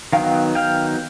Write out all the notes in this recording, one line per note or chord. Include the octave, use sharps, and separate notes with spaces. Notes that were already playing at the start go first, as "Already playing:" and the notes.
D#3 F#3 B3 F5 G5
F5 G5